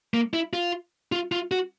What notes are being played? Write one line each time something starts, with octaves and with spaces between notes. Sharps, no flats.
A#3
E4
F4
F4
F4
F#4